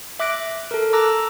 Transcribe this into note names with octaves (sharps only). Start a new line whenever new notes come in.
E5 D6 F#6 A#6 D7
A4 A#4
A5 A#5 D6 E6 F#6 A#6